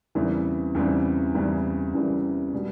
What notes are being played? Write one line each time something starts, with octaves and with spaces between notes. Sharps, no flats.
E2 C#3 E3 G3 C4
E2 C#3 E3 G3 C4
E2 C#3 E3 G3 C4
E2 C#3 E3 G3 C4
B2 G3 B3